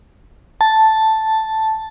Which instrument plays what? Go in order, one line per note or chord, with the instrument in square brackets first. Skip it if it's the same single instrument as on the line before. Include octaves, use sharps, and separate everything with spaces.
[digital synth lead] A5